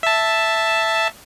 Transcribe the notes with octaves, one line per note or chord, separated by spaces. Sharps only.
E5 A5